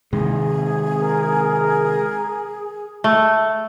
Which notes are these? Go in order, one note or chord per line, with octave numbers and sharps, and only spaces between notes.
C3 D#3 G#3 G#4
A#4
A3